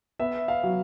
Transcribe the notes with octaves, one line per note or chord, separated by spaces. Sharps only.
B3 E5
F5
F#3